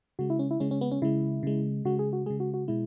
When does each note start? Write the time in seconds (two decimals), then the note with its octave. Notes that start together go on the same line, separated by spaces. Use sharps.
0.19 C#3 G#3 F#4
0.30 E4
0.39 C#4
0.51 E4
0.60 C#3 G#3 C#4
0.71 C#4
0.81 B3
0.92 C#4
1.02 C#3 G#3 E4
1.43 C#3 G#3
1.85 C#3 G#3 F#4
1.99 G#4
2.13 F#4
2.26 C#3 G#3 G#4
2.40 F#4
2.54 F#4
2.68 B2 G#3 E4